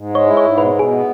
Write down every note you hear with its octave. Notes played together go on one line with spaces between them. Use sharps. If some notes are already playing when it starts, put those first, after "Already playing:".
Already playing: G#2
G#3
C#5
E4
G#2 C#5
B2 B4
B2 G#4
B3